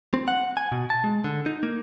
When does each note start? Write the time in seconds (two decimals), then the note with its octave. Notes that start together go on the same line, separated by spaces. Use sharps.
0.14 C4
0.28 F#5
0.57 G#5
0.72 B2
0.90 A5
1.04 G#3
1.24 D3
1.46 D#4
1.63 A#3